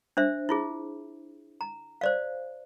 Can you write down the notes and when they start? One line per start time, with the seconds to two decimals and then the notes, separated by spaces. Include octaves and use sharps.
0.17 D4 C5 E5
0.49 E4 F4 G#4
1.61 A#5
2.01 C5 D5 F5